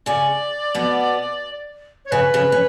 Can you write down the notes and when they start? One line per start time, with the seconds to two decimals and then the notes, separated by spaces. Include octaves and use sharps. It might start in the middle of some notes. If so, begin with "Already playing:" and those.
0.06 C#3 C#4 D5
0.75 B2 B3
2.05 C#5
2.11 C#3 C#4 B4
2.34 C#3 C#4
2.52 C#4